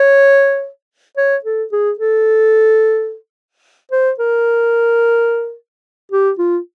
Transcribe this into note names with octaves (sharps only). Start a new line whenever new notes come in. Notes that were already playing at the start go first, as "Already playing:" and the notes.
Already playing: C#5
C#5
A4
G#4
A4
C5
A#4
G4
F4